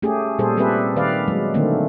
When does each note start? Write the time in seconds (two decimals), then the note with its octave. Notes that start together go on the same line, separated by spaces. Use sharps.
0.02 A3 C#4 G4 G#4
0.39 A#2 G3 G#4 A4 C5
0.57 G3 C4 G4 A4 B4 E5
0.96 D#3 B4 D5 F5
1.28 F#3 G#3
1.54 D3 D#3 A3 A#3 C4